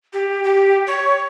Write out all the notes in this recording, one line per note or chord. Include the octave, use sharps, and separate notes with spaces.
G4
G4
C#5